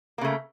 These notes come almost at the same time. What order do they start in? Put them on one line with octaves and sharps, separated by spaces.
A#3 C#3 A3